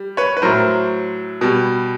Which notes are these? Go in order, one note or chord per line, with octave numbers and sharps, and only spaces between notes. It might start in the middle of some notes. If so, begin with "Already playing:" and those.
Already playing: G3
B4 C#5
B4
A2 F#3 A#4 C5
B2 G3